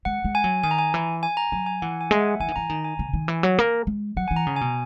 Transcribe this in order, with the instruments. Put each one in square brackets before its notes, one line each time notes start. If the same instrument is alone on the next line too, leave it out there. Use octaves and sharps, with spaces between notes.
[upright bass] G#3 [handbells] F#5
[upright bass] G#3
[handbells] G#5
[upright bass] F#3
[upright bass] D#3 [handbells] G#5
[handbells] A#5
G#5
[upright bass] E3
[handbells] G#5
A#5
[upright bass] F#3 [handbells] G#5
[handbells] G#5
[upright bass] E3 [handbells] F#5
[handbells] G#5
[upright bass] G#3 [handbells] E5
[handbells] F#5
[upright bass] E3 [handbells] G#5
[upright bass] D#3
[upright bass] E3 [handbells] A#5
[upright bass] D#3 [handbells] A#5
[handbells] G#5
[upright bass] C#3
D#3
E3
F#3
A#3
G#3
[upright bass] F#3 [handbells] F#5
[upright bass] E3 [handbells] G#5
[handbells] A#5
[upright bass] C#3
[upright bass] B2 [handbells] G#5